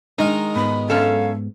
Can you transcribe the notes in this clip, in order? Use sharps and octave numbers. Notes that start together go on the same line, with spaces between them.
D#3 G#3 D#4 A#4
G#2 B3 B5
F#2 C#4 A4 F5